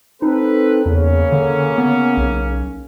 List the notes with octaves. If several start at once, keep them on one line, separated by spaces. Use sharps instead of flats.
C4 D#4 A4 B4
E2 C#3 A#3 C#4
D3
B3
B1